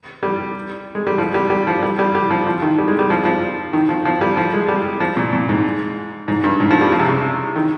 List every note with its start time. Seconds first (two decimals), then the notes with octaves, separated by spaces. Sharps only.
0.23 G3
0.95 G#3
1.07 G3
1.18 F3
1.34 G3
1.50 G3
1.67 F3
1.82 G3
1.99 G3
2.15 G3
2.31 F3
2.47 F3
2.62 D#3
2.78 G3
2.88 G#3
2.99 G3
3.10 F3
3.25 F3
3.73 D#3
3.89 F3
4.05 F3
4.21 G3
4.37 F3
4.53 G#3
4.68 G3
5.00 F3
5.17 A#2
5.33 A#2
5.49 G#2
6.28 G#2
6.44 G2
6.60 G#2
6.71 F3
6.81 G3
6.92 F3
6.99 C3
7.08 C#3
7.56 D#3